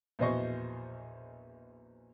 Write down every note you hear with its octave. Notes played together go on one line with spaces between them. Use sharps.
A#1 E2 B2 C5 D#5 C#6